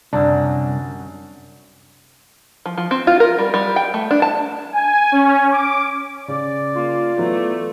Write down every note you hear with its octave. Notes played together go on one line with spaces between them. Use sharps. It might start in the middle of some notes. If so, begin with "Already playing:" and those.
C2 F#2 D3 F#3 D4
F3
F3
C4
F4
A#4
G3
G3
G5
A3
D4
A5
G#5
C#4
D6
C#3 D5
A#3 F4
E3 F#3 A3 B3